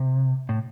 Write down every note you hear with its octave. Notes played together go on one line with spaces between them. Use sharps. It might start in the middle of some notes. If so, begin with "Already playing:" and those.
Already playing: C3
A2